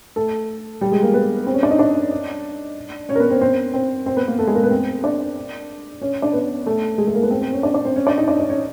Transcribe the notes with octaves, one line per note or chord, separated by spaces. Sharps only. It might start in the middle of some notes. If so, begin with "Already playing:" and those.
A3 A4
G3 G4
G#3 G#4
A#3 A#4
B3 B4
C4 C5
C#4 C#5
D4 D5
D#4 D#5
D4 D5
C#4 C#5
A#4
B3 B4
C4 C5
C4 C5
C4 C5
C4 C5
B3 B4
A#3 A#4
A3 A4
G#3 G#4
A#3 A#4
B3 B4
C4 C5
D4 D5
C#4 C#5
D4 D5
B3 B4
A3 A4
G#3 G#4
A3 A4
A#3 A#4
B3 B4
C4 C5
C4 C5
C#4 C#5
D4 D5
D4 D5
C4 C5
C#4 C#5
D4 D5
D#4 D#5
D4 D5
C#4 C#5
C#4 C#5